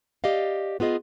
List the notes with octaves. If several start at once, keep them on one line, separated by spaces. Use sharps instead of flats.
G4 D5 D#5 F5
B3 F4 G#4 D#5